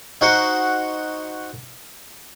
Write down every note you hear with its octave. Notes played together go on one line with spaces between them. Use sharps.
D#4 F#4 C5 F#5